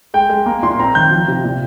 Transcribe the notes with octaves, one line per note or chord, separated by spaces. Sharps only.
G#3 G5
G#3
A#3
A#2 C6
C4 A#5
D#3 G6
F3
C3
A#2